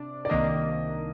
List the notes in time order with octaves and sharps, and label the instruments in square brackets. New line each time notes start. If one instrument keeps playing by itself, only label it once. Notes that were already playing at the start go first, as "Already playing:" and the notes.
Already playing: [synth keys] C3 D4 [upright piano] D5
[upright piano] D5
[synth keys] C2 C3 D#3 A#3 D4 [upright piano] D#5